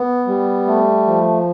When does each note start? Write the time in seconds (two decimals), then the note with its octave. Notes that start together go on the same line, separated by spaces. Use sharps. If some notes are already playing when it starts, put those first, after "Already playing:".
Already playing: B3
0.27 G3
0.67 A3
1.07 F3